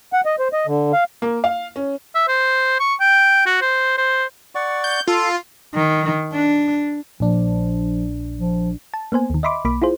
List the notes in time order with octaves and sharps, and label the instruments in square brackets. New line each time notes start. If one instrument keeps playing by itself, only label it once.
[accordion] F#5
D#5
C5
D#5
D3
F5
[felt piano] A#3
F5
C#4
[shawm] E5
C5
C#6
G5
F#4
C5
C5
[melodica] D5 F#5 C#6
[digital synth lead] G6
[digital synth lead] F4 [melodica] A4
[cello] D#3
D4
[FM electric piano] A#1 D4 [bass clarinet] F3
[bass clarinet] F3
[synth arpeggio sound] A5
A#3 B3 C5 G#5
D#2 D#3
D#5 E5 B5 C6 D6
B1 A#3 B5 D6
E4 F4 G#4 C5